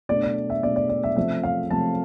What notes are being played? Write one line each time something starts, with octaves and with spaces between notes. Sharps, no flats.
B2 A3 D4 D5
D5
E5
B2 A3 D4 D5
D5
D5
E5
C3 F3 A3 C4 E5
F5
C3 F3 A3 C4 A5